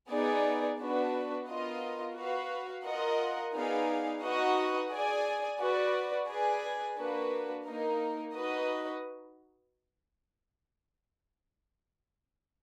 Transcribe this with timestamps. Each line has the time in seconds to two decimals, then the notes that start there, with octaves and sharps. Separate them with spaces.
0.10 B3 D#4 G#4 D5
0.79 B3 D4 F#4 B4
1.47 B3 F4 A#4 D#5
2.16 F#4 B4 F5
2.85 F4 A#4 D#5 F#5
3.54 B3 D#4 G#4 D5 F5
4.22 D#4 F#4 B4 D#5 F#5
4.91 G#4 D5 G#5
5.60 F#4 B4 D5
6.28 G#4 B4 D5 G#5
6.97 A#3 D4 F#4 B4
7.66 A#3 D#4 A#4
8.35 D#4 F#4 B4 D#5